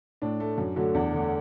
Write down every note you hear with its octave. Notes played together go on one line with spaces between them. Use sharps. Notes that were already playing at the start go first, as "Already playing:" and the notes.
A2 D4
A3
F#2
D3 F#3 A3
E2 D4
D3 A3